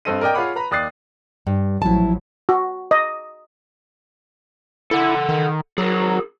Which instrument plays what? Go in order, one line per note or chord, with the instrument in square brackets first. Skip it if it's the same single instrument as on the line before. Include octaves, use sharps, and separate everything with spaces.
[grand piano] G2 C4 A4 D#5 D#7
A#4 D5 D#5 G5
F4 G#4 C#5 F#5 B5 D6
B4 A#5 B5
D#2 D5 D#6 F#6 A6 C7
[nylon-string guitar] G2
[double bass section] A1 F3 F#3 [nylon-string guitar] E4 A5
[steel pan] F#4
D#5
[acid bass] E4 [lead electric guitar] A4 F#5
[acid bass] D#3
[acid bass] F#3 [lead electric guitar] G#4 A#4